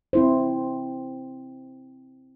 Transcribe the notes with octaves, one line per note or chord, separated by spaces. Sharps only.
C4 E4 C5